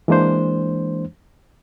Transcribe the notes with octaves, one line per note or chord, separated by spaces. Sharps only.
E3 G#3 A#3 D4 C5